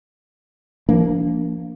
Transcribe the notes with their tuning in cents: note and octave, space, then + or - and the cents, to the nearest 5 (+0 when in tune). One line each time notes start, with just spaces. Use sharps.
F3 -35 A#3 +0 D4 -30